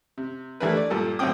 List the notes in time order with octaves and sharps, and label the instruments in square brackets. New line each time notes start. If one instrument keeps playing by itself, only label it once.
[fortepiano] C3
E3 G3 A3 D4 A#4 B4
D5
G2 A#2 G4 A4
B1 A2 D3 C4 G5 D#6